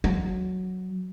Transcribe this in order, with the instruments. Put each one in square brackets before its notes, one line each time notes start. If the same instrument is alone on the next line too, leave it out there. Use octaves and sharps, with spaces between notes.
[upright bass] F#3